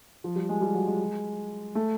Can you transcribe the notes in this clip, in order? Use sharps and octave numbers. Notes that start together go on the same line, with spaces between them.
F3
G3
G#3
G3
F#3
G#3
A3